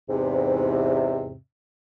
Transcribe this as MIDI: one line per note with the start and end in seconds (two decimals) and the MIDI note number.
0.09 1.36 40
0.09 1.36 44
0.09 1.36 48